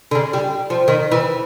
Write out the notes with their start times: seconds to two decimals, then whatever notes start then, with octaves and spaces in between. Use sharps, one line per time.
0.11 D3
0.15 C#3
0.33 G3
0.70 F3
0.88 D#3
1.12 E3